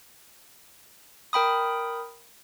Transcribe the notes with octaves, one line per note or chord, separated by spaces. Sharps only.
A#4 G5 B5 D#6